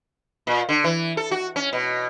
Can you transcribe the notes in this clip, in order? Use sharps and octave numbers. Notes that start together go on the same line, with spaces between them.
A#2
D3
E3
A4
F#4
C#4
B2